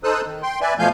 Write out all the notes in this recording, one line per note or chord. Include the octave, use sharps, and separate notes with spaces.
D#4 A4 C5 D#6 E6 F#6
D#3
G5 C6
B4 D5 E5 G#5
B2 F3 A3 F5 G#5 G6